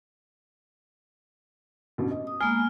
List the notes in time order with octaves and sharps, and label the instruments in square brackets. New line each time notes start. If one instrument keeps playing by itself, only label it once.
[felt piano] A1 G2 B2
D#5
[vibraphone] D#6
[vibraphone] G#3 A#3 B3 [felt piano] G#5 [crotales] F6